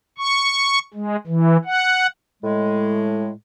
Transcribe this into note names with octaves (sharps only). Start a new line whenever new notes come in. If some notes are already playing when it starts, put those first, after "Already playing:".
C#6
G#3
E3
F#5
A2 G#3